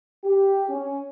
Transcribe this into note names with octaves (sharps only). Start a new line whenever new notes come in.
G4
C#4